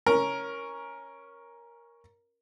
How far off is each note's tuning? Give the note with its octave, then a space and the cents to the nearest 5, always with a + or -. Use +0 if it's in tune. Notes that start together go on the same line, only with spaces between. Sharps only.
C#4 +0 A#4 +10